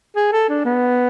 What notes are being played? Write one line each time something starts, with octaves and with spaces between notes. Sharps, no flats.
G#4
A4
D4
B3